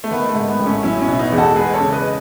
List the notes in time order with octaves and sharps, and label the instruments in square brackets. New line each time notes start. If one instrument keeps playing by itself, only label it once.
[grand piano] A3
[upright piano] D#3 [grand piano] B3
[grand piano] A3
[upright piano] G#2
[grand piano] B3
[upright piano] A1
[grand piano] A3 C#4
[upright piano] F#3 [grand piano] C#4 E4
[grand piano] C#4 E4
[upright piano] B2
[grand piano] E4
B3 D#4
[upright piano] E2
[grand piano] F#4 A4
[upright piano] G#3 [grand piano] G#4 B4
[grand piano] A4 C#5
[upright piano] C#3
[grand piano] B4 D#5